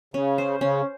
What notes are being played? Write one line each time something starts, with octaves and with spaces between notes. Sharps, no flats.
C#3 C#4
C5
C#3 C#4